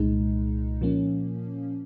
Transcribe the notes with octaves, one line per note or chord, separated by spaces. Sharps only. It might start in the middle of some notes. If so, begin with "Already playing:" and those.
Already playing: C2 A#2 G#3 D#4
A#2 F3 A#3 C#4